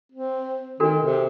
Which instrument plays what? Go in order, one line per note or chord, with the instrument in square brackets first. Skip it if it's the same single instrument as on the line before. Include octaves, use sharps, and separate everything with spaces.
[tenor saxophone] C4
[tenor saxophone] D#3 [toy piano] D4 F#4 A4
[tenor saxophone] C3